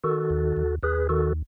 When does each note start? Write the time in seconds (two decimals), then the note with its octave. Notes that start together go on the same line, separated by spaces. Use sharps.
0.04 D#3 F#4 A4
0.30 D#2
0.57 D#2
0.83 D#2 G#4 B4
1.09 D#3 F#4 A4